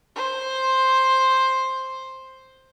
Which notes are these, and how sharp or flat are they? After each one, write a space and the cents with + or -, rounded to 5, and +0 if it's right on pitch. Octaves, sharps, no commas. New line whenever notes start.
C5 +5